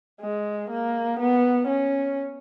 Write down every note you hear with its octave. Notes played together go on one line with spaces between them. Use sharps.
G#3
A#3
B3
C#4